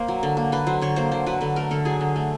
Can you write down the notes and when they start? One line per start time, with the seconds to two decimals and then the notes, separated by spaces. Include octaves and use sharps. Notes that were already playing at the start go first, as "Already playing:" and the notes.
Already playing: A#3 C5
0.08 F#3
0.23 D3
0.37 A#3
0.52 D3 B4
0.66 F#3 C5
0.81 D3 C#5
0.96 A#3 C5
1.11 D3 C5
1.26 F#3 B4
1.41 D3 B4
1.56 A3 A#4
1.71 D3 A4
1.85 F#3 G#4
2.01 D3
2.16 A3